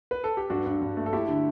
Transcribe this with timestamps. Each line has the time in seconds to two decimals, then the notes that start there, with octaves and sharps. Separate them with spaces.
0.11 B4
0.24 A4
0.37 G4
0.50 G2 D4 F#4
0.66 G2
0.81 G2
0.97 A3
1.06 A4
1.13 A3 E4 G4
1.28 D3